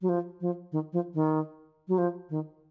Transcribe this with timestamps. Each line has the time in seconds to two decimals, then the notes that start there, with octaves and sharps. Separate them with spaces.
0.02 F#3
0.09 F3
0.41 F3
0.72 D#3
0.93 F3
1.14 D#3
1.88 F#3
1.98 F3
2.30 D#3